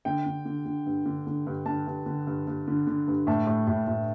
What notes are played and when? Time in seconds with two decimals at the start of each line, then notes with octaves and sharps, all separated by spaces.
0.05 D3 G5
0.26 D3
0.45 D3
0.66 D3
0.86 G2
1.06 D3
1.27 D3
1.47 G2
1.66 D3 A5
1.87 G2
2.06 D3
2.27 G2
2.47 G2
2.68 D3
2.87 D3
3.08 G2
3.27 A2 A5
3.47 A2
3.67 A2
3.87 A2